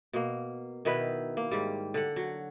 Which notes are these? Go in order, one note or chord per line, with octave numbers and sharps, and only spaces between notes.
B2 A#3
B2 D#3 E4 B4
A#3
G#2 G3
D3 F#5
F#3